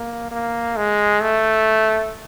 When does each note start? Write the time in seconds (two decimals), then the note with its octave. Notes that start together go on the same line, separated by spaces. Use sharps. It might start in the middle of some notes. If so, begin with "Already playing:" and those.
Already playing: A#3
0.31 A#3
0.77 G#3
1.22 A3